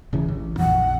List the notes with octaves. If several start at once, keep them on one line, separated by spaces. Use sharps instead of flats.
D1 C#3 E3
A1
A#1 F2 F#5